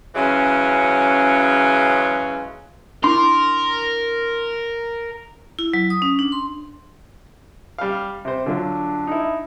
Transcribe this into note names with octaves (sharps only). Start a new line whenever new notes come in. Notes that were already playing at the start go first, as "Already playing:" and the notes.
C#3 E3 F#3 G#3 C#4
D4 E4 A#4 C6 D6
E4
F#3
D#6
C#4
D4
C6
G3 F5
C3 C5
D3 F#3 D4 F4
D#4 E4